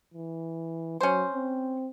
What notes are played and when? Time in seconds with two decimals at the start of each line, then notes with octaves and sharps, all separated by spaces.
0.14 E3
1.01 F#3 C#4 C5
1.33 C4